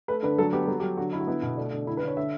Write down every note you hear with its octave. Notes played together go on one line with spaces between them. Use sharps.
A3 B4
D3 B4
F#3 A4
B3 G4
F#3 A4
G4
F#3
D3 F#4
D3 E4
F#4
B3 E4
B2
A3 D4
D3
D3 E4
B4
D3
C#5
D3 E5